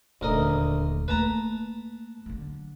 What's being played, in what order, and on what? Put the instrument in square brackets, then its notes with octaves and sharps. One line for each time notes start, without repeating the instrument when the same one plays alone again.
[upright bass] D#1 [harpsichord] D2 A#4 D#5
[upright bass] A3 A#3 [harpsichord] B4 A5 A#5
[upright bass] D3 F#3